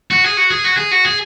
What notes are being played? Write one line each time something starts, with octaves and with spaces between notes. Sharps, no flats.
F#4
G#4
F#4
G#4
F#4
G#4
F#4
G#4